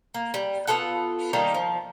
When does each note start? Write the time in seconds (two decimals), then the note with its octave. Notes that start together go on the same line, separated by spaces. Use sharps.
0.14 A#3
0.34 G3
0.67 B3 F4 A4 F#5
1.33 D#3 G3 A#3 D#4
1.54 F3